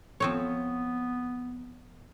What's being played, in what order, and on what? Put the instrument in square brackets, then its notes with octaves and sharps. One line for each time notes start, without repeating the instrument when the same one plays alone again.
[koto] F3 C4 C#5 [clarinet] B3